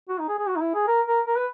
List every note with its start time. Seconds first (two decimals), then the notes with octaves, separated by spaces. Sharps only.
0.09 F#4
0.19 D#4
0.29 G#4
0.39 G#4
0.48 F#4
0.56 D#4
0.61 E4
0.74 G#4
0.87 A#4
1.07 A#4
1.27 A#4
1.36 B4